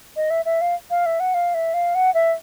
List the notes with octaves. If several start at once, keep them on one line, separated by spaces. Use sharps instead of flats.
D#5
E5
E5
F5
F5
E5
F#5
F5
E5
F5
F#5
E5